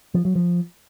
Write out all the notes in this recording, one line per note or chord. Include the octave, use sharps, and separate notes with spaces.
F3
F#3
F3